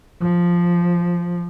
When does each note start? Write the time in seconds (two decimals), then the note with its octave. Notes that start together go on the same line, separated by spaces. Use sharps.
0.22 F3